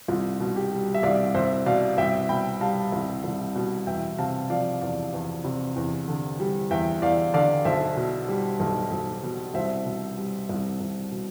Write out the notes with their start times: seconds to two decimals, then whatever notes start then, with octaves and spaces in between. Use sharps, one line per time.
0.08 C2 F4
0.40 B2
0.56 G4
0.72 G3
0.94 E5
1.03 C2 D5 F5
1.34 C2 C5 E5
1.66 B2 D5 F5
1.98 C2 E5 G5
2.29 B2 G5 B5
2.61 G3 F5 A5
2.92 C2
3.24 C2
3.55 B2
3.87 E2 E5 G5
4.18 C3 F5 A5
4.50 F3 D5 F5
4.82 E2 D5 F5
5.13 E2
5.44 C3
5.76 E2
6.08 D3
6.40 G3
6.71 E2 E5 G5
7.02 E2 D5 F5
7.34 D3 D5 F5
7.65 B1 C5 E5
7.97 B2
8.29 G3
8.60 B1
8.92 B1
9.23 B2
9.54 C2 C5 E5
9.86 B2
10.18 G3
10.49 C2
10.80 C2
11.12 B2